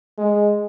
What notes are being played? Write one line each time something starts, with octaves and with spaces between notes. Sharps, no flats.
G#3